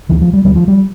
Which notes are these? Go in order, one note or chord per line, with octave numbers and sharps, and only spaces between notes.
D2 D3 E3
F3
G3
D2 D3 G3
F3
G3